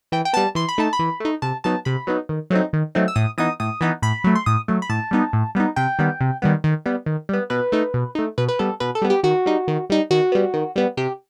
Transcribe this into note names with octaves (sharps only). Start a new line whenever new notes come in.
E3 G5
G5
G3 B3 A5
E3 C6
B5
A3 D#4 A5
B5
E3
A3 D#4
C3 A5
F#3 B3 D#4 A5
C3 B5
F#3 B3 D#4
D#3
F#3 A3 C4 D#4
D#3
F#3 A3 C4 D#4
E6
A2 D#6
E3 B3 D#4 D#6
A2 D#6
E3 B3 D#4
A2 B5
F#3 A3
C6
A2 D#6
F#3 A3
B5
A2 A5
G3 B3 D#4
A2
G3 B3 D#4
C3 G5
D#3 G3 B3
C3
D#3 G3 B3
D#3
G3 B3
D#3
G3 B3
B2 B4
A3 D#4
B2
A3 D#4
B2 B4
B4
G3 B3 A4
B2 B4
A4
G3 B3
G4
D#3 F#4
G3 D#4
D#3
G3 D#4
D#3 F#4
G3 B3
D#3
G3 B3
C3 G4